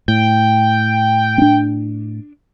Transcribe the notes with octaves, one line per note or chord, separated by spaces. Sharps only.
A2 G5
C#4 D4